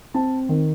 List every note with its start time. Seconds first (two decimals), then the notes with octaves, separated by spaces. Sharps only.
0.14 C4 A5
0.49 D#3